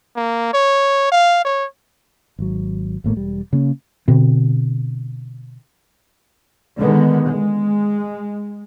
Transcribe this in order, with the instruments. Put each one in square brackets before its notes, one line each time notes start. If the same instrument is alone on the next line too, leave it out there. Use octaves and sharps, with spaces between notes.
[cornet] A#3
C#5
F5
C#5
[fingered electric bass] G#1 F#3
G#1 A2 A3 A#3
E1 G3
C#3 A#3 C#4
[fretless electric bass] B2 D3 C4
[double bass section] D3 D#3 G#3 B3
G#3